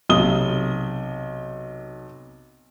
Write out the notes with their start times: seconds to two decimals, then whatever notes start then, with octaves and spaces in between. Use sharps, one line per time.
0.10 B1 C3 D#6 G7